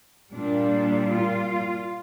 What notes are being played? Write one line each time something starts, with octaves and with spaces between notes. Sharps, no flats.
A#2 G3 A#3 D4
F4